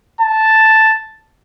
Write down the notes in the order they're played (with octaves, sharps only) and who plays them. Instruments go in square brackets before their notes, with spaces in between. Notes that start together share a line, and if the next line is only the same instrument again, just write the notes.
[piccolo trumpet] A5